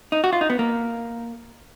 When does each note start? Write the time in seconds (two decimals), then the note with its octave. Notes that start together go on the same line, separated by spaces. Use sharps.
0.12 D#4
0.24 F#4
0.33 F4
0.41 D#4
0.50 B3
0.59 A#3